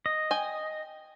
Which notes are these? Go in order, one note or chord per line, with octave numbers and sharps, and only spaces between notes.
D#5
G5 G#5